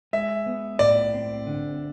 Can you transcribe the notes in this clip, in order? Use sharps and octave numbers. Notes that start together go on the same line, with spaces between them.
G#3 E5
B3
A2 D5
C4
D3